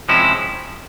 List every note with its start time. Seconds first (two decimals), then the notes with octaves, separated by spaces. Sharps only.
0.09 C3 F3 G#3 C#4 E4